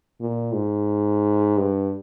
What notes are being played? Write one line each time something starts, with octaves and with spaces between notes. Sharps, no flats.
A#2
G#2
G2